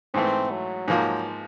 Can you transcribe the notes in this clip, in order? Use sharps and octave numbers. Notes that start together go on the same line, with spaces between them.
G#2 E3 A3 C4
F#3
G#2 F3 A#3